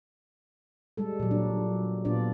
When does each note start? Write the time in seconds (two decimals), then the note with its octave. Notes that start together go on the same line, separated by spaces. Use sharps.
0.97 G3 G#3 A4
1.20 A#2 F#3
1.31 D4
2.05 A#2 B3 D4 F4 D5